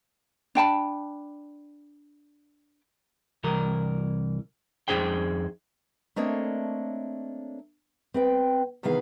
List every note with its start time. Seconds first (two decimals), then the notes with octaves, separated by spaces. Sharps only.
0.55 D4 G5 A5 B5
3.44 C2 E3 A#4
4.88 F2 E3 D#4 G#4 C5 G5
6.16 A3 A#3 C4 D4 C#5 D#5
8.14 C4 B4 G5
8.83 C3 D#3 E3 B3 G#4 F5